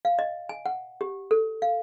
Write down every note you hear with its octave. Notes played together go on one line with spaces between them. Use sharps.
F5
D#5
G#5
F#5
G4
A4
F5